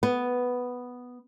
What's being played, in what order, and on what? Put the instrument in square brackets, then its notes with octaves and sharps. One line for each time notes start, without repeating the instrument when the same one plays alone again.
[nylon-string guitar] B3